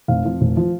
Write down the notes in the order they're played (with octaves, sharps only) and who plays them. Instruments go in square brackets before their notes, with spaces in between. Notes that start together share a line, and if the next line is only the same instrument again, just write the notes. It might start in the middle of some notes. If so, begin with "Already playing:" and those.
[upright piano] F1 F5
F2 F3
F1
F3